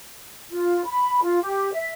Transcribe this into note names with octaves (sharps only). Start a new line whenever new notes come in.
F4
B5
F4
G4
E5